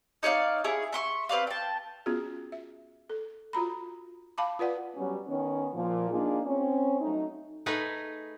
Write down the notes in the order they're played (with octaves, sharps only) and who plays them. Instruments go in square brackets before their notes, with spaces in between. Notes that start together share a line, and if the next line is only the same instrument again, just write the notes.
[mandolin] D#4 C#5 D5 F5
E4 G#4 C#5
E5 C6 C#6
C4 B4 D5 F5
G5 A5
[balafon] B3 C#4 F4 F#4 G#4
E5
A4
F4 F#4 A#5 B5
F5 A5 B5 D6
F4 B4 D5 F#5
[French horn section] F#3 G3 B3 C#4
D#3 B3 C#4
A#2 F3
A#3 D4 D#4 F4 G#4
C4 C#4
F#3 A3 D#4
[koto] A3 D#4 G#4 B4